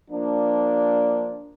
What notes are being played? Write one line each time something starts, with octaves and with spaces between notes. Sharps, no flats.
F3 A#3 D4